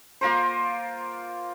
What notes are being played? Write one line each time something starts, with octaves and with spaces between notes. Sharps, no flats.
A#3 F4 A#4 C5